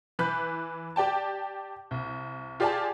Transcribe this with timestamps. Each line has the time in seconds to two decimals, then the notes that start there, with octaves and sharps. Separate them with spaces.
0.19 E3 B4 F#6 G6 B6
0.96 G4 D5 G5 A5
1.91 C2
2.60 F4 G4 G#4 D5 G#5 A5